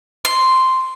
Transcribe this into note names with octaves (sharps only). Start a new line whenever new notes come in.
C6